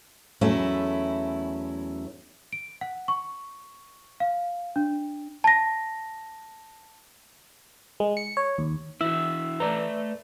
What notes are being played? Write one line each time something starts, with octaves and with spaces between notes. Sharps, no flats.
E2 F#3 A3 C#4 E4
D7
F#5
C#6
F5
D4
A5 A#6
G#3
C#7
C#5
D#2
E3 E4 F#4 E5
A3 A4 B4 D5 A#5